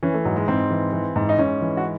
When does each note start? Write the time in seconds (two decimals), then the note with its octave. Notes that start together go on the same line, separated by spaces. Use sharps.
0.03 E3 C#4
0.14 A3
0.25 G#2 F#3
0.36 G#3
0.48 G#2 C4
0.71 E3
0.93 E3
1.16 G#2
1.29 D#4
1.38 G#2 C#4
1.61 E3
1.77 F#4